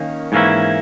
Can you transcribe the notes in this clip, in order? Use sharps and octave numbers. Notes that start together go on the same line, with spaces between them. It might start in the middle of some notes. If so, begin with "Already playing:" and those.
Already playing: D#3 A#3 C#4
G#2 E3 A#3 C#4 E4